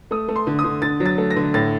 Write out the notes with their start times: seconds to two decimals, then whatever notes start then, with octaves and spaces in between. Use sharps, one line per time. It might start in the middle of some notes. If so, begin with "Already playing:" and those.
0.11 A3 D#6
0.28 A3
0.36 C6
0.47 D3
0.59 D#6
0.64 D3
0.82 D3 A6
1.00 F#3
1.06 A6
1.18 A3
1.30 A#6
1.36 D3
1.54 A2 A6